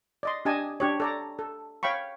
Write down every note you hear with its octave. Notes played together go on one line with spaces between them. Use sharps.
D5 D#5 C6
D4 G4 D#5 G#5 A5
D4 G4 C#5
A4 D5 A#5
A4
C#5 F5 G5 B5 C#6